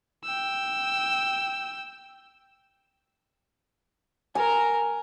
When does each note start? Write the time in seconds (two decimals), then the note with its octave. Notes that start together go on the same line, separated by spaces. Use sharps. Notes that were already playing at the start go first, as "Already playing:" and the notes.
0.24 G5 E6
4.35 A#4 G#5 A#5